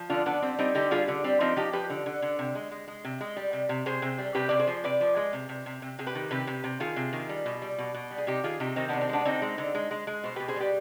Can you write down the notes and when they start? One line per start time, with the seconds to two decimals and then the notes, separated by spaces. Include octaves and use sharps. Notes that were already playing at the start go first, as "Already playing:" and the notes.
Already playing: F3
0.10 D3 D4 F4
0.26 D3 B3 D4
0.42 G3 C4
0.59 G3 C4 D#4
0.75 D3 D#4 G4
0.91 G3 F4 G#4
1.08 D3
1.24 G3 C4
1.40 F3 C4 D#4
1.56 F3 D#4 G4
1.73 F3 G4 B4
1.90 D3
2.06 D3
2.22 D3
2.39 C3
2.55 G#3
2.71 G#3
2.88 G#3
3.04 C3
3.21 G#3
3.37 G3
3.53 C3
3.69 C3
3.86 C3 G#4 C5
4.02 C3
4.18 G3
4.35 C3 G4 B4
4.49 C3 D5
4.59 G#4 C5
4.67 F3
4.84 C3 B4 D5
5.01 F3
5.16 G#3
5.33 C3
5.49 C3
5.66 C3
5.82 C3
5.99 C3 G#4
6.06 G4 B4
6.15 D#3
6.31 C3 G4 B4
6.47 C3
6.64 C3
6.80 D#3 F4 G#4
6.96 C3
7.13 D#3
7.29 G3
7.46 B2
7.62 G3
7.78 B2
7.94 B2
8.11 G3
8.18 G#4
8.27 C3 D#4 G4
8.44 D#3 F4 G#4
8.60 C3 D#4 G4
8.76 D#3 C4 D#4
8.89 B3 D4
8.93 C3
9.01 C4
9.09 G#3 B3 D4
9.25 D3 C4 D#4
9.42 G#3
9.58 D3
9.75 G#3
9.91 G#3
10.07 G#3
10.24 B2 C5
10.36 G4 B4
10.40 B2
10.48 G#4 C5
10.56 G3 G4 B4